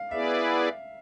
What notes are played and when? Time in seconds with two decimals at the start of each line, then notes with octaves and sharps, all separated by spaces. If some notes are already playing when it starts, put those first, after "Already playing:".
Already playing: F5
0.11 B3 E4 G#4 B4 D5 E5